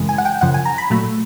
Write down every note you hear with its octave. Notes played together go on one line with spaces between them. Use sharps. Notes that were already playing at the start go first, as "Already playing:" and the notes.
Already playing: F#2 C#3 E3 G#3
G#5
F#5
G5
F#2 C#3 F3 F#5
G#5
A#5
B5
A#2 F#3 A3